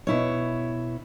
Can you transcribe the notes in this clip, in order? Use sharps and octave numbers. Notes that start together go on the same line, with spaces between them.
B2 E4 C#5